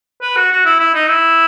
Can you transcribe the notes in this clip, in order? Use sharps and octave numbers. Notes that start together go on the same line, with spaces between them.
B4
F#4
F#4
E4
E4
D#4
E4